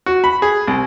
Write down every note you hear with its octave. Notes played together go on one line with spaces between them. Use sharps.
F#4
B5
G#4
C2